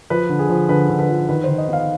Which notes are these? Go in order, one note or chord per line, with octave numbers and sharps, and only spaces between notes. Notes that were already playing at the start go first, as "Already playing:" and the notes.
F3 B4
D3
G#4
F3
D3 B4
D3
B4
F3
D#3 B4
D#3 C5
D#5
B3 F5